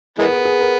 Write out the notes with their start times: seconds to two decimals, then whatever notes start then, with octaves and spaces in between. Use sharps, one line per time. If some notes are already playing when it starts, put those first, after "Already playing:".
0.19 E3 G#3 B3 A#4
0.27 G#4
0.36 A#4
0.45 G#4
0.61 A#4